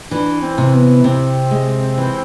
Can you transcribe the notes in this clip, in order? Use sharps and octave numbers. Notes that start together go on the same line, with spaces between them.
E3 D4
C4
C3
B3
C3 C4
G#3
E3